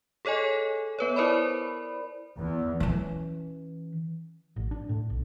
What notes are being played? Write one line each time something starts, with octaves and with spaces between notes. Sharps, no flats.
G#4 A4 C#5 D#5 G#5
B3 B4 C#5
E4 A#4 C5 D5 B5
E2
E3 C#4
A1
D4
A2
B1